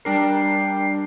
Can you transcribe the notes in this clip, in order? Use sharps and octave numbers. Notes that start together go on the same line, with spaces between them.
G3 D4 A#4 G5 C7